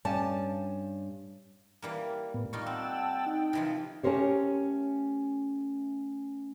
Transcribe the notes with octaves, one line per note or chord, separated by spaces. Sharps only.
G2 G3 C#4 A5
E3 G3 A#3
A2 B3
G3 D#4 F4 C#6
C4 F#5 G5 A5 E6
D#4
C3 E3 F3
A3 C#4 G4 A#4 C5 C#5